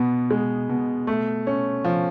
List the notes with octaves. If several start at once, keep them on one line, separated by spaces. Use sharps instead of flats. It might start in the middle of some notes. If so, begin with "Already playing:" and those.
Already playing: B2 B3
G#3
B2
A3
C#4
F3